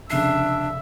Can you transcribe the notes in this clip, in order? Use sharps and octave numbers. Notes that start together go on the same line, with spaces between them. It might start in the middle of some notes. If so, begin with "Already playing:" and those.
F1 C#3 D4 E5 C7